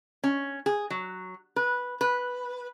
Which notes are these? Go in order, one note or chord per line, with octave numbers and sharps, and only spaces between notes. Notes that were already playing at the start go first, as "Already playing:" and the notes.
C#4
G#4
F#3
B4
B4